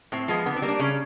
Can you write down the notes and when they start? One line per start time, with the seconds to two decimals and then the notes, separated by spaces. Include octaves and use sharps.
0.12 A2 C4
0.28 F3 G#3 B3
0.46 D3 B3
0.56 C4
0.62 G3 A#3
0.69 D4
0.79 C#3 C#4